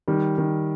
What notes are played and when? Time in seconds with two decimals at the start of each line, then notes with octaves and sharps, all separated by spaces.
0.08 D#3 G3
0.38 D#3